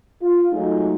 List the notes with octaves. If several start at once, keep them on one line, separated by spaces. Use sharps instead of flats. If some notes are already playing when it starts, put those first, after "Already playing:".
F4
F#3 G#3 A3 D#4